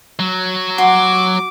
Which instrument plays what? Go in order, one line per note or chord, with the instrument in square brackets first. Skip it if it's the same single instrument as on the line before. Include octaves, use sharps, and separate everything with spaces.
[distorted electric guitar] F#3
[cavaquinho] F#4 C6 [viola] D6